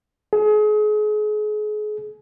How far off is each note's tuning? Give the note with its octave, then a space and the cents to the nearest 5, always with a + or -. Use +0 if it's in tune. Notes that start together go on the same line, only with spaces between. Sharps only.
G#4 +35